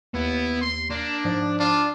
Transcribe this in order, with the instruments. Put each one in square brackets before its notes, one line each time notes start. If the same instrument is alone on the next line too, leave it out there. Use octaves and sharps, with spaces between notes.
[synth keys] D#2 [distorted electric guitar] B3 [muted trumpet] E4
[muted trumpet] C6
[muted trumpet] A#3 [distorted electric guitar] D4
[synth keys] G#2 F3 D5
[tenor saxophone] D4 [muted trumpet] F4